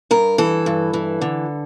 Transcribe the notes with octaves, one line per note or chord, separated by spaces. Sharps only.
G2 A#4
E3 A4
G2
E3
D3